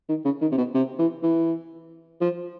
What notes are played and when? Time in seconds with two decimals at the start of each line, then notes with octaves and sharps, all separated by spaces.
0.09 D#3
0.25 C#3
0.41 D#3
0.52 C3
0.58 B2
0.74 C3
0.99 E3
1.23 E3
2.21 F3